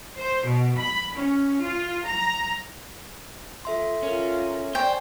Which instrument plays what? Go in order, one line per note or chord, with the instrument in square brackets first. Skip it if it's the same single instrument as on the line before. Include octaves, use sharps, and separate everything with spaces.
[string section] C5
B2
B5
C#4
F4
A#5
[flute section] F4 [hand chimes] A4 E5 C6
[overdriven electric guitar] C#4 [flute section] F4 A#4
[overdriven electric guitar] C5 [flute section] D5 [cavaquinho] G5 [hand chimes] G#5 C#6